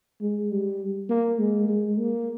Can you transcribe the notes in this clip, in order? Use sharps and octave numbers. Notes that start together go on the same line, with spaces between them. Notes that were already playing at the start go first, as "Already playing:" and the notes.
G#3
G3
A#3
G#3
G#3
A#3